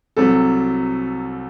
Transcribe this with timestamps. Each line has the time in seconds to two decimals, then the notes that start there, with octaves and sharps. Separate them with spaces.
0.17 C2 C3 F#3 A4